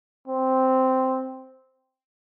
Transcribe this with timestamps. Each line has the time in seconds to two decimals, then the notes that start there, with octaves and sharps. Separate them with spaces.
0.28 C4